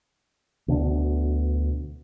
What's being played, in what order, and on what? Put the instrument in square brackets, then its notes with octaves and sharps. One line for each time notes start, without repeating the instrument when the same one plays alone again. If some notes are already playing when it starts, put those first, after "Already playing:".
[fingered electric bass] D2 B2 D3 D4